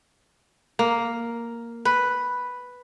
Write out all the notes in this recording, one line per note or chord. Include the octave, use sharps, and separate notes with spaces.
A#3
B4